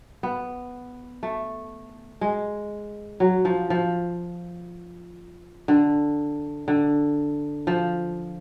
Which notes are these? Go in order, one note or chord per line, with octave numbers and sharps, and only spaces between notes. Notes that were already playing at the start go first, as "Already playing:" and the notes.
B3
A3
G#3
F#3
F3
F3
D3
D3
F3